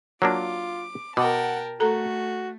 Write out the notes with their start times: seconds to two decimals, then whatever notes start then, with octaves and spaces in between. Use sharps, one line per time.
0.22 F#3 A#3 D4 F4 D6
1.17 B2 A#4 F#5 G5 A5 D6
1.80 A3 F#4 A4 A#5